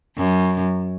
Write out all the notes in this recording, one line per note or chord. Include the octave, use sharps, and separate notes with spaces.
F#2